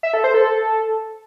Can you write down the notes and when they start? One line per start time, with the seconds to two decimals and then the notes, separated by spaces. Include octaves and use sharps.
0.03 E5
0.14 A4
0.24 C5
0.34 A4